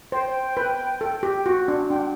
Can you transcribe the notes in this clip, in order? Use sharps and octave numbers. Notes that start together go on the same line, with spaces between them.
C5 G5
B4
A4
G4
F#4
D4
D4 G5
F#5